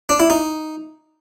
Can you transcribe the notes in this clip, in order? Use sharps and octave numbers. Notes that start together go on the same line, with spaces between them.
D4
E4
D#4